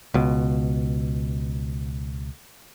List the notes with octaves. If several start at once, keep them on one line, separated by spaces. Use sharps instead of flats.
C#2 B2